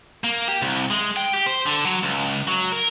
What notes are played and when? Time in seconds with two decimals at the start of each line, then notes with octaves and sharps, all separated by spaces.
0.24 A#3
0.48 G4
0.62 C2
0.91 G#3
1.17 G5
1.33 G4
1.46 C5
1.66 D3
1.85 F#3
2.03 C#2
2.48 F#3
2.72 A#4